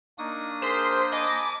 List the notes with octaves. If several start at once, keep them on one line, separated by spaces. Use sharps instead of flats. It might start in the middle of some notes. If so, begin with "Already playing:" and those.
A#3 D4 D#4 C#6 D#6
G#4 A#4 C5 C6 B6
D#5 G#5 A5 B5 D6